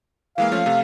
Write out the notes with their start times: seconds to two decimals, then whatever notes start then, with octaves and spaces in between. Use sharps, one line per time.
0.38 E3 G#3 A#3 F5
0.52 F3 A3 C#4
0.66 C3 A3